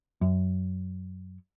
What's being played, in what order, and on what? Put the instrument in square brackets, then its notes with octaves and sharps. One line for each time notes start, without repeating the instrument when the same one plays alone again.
[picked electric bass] F#2